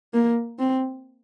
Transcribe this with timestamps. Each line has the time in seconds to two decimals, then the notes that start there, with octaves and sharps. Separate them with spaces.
0.14 A#3
0.59 C4